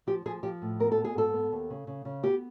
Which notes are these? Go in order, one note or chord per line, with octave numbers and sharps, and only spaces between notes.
F3 G4
F3 G#4
F3 G4
A2
B3 A#4
A4
B3
G#4
G#2 A4
B3
D#2
C#3
C#3
C#3
B3 G4